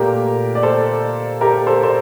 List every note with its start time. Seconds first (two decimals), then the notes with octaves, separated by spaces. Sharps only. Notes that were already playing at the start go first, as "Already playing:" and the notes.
Already playing: A#2 A3 G4 A#4
0.55 D5
0.63 A4 C5
1.41 G4 A#4
1.67 A4 C5
1.83 C5